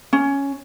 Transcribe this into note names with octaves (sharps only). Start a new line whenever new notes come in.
C#4